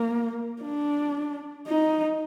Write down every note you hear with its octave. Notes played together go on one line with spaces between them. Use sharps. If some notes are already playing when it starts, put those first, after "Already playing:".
Already playing: A#3
D4
D#4